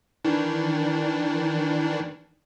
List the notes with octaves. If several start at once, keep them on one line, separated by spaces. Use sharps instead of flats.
D#3 E3 D4